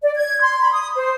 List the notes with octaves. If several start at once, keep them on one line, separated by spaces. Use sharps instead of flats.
D5
G#6
C6
B5
D#6
C5